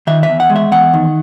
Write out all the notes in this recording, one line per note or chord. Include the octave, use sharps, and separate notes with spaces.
D#3 E5
E5
E2
F#5
G#3
E5
E2 F#5
D#3